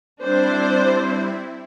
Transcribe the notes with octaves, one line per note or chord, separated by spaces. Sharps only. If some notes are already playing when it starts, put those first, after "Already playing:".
G3 C4 D4 E4 C5